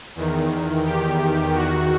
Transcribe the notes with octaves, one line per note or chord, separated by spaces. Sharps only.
E2 D#3
G4
E2 D#3 F#4